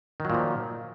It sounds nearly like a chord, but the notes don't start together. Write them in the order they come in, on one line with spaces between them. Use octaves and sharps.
D#3 F#3 A#2 F3